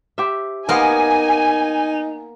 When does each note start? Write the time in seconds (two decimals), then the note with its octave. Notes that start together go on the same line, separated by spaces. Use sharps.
0.18 G4 C5 E5
0.69 A#3 B3 D#4 A#4 C5 D#5 F5 G#5